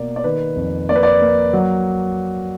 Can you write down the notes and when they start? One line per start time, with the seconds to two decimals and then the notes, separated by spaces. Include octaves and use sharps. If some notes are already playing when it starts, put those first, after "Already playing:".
Already playing: B2 A#3 D5
0.16 D5
0.24 D#3 B4
0.56 F2
0.89 A#3 D5
0.96 B4
1.03 D5
1.21 A#3
1.53 F#3